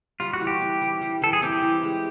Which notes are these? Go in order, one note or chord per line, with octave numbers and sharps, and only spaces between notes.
G3 F4
F#4
E3
G4
C4
E3
G3
E3 A4
G#4
C4 G4
E3
G#3